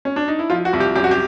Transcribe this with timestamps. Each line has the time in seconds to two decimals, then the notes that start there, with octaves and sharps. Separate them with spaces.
0.05 C#4
0.16 D4
0.28 D#4
0.39 E4
0.50 F3 F4
0.65 F#4
0.73 C2
0.80 G4
0.96 F#2 G4
1.04 F#4
1.11 G4